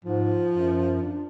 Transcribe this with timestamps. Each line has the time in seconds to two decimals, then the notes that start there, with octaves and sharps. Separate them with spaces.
0.04 G#2 F3
0.51 F#2
1.02 D4